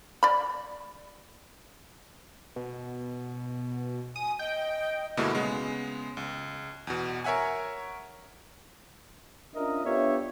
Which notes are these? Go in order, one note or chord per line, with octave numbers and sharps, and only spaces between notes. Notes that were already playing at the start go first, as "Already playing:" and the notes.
D5 B5
B2
G#5 D#6
D#5 G5
G2 B2 D3 G#3 A#3 E4
C#3 G#3 B3
C#2
E2 B2
A#4 C#5 E5 F#5 G#5
C#4 D4 F4 A#4 D#5 E5
B3 D4 F4 G4 C#5 E5